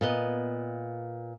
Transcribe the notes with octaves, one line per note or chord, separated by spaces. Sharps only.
A#2 B3 D#5